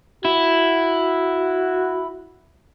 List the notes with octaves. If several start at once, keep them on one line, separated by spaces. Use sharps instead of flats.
E4 F#4